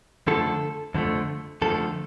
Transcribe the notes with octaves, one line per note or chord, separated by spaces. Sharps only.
F2 D3 F3 A3 A4
F2 D3 F3 A3
F2 D3 F3 A3 A4